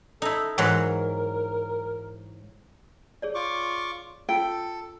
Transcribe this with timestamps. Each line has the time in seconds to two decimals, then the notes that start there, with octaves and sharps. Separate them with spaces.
0.22 D#4 E4 A4
0.58 G#2 E3 F#3 A#4
3.22 G#4 C#5 D5
3.35 F4 C#6 D6
4.29 C#4 F4 A4 F5 G5